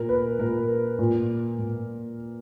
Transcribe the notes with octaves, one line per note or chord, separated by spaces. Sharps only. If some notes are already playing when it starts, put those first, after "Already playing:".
Already playing: A#2 A#4
B4
A#2 A#4
A#2
A#2